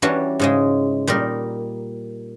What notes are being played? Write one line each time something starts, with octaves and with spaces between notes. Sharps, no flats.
E3 G3 C#4 D4 F#4
G#2 C#3 G#3
A#2 G3 D#4 A#4